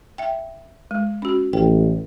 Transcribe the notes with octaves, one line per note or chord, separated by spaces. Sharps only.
E5 G5
G#3
C#4 F#4
A1 G5